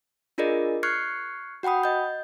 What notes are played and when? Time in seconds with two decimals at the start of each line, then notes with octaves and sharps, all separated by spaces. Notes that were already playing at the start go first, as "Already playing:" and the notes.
0.38 D4 F4 G#4 A#4 D5 D#5
0.83 C#6 F6 F#6 G#6 C7 C#7
1.63 F#4 F#5 G5 B5 D#6
1.84 D#5 G6